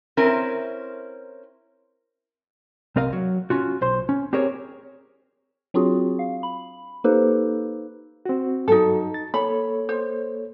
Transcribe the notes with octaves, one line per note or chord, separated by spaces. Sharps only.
C4 C#4 E4 A#4
C2 C4 A#4 D#5 F5
F#3
C#4 F4 F#4
B1 C5 C6
C#4
C4 G4 G#4 A#4 C5 C#5
F#3 C4 D4 F4 F#4 G#4
F5
B5
A#3 D#4 G4 A4 B4 C5
C4 F#4
G2 F#3 D#4 F#4 A4
A6
A#3 A4 C#5 B5
C5